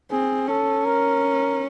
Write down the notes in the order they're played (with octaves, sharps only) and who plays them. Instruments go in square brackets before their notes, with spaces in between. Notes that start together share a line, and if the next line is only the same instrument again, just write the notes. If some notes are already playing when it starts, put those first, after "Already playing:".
[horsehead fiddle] C4 [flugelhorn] G#4
[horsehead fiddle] C#4 [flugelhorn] A4
[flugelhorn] A#4